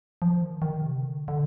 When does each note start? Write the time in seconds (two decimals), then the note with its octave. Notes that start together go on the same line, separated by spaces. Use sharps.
0.22 F3
0.42 D#3
0.62 D#3
0.82 C3
1.01 D3
1.28 D3